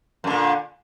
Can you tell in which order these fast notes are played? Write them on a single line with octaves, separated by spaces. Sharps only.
F#2 D3 A#2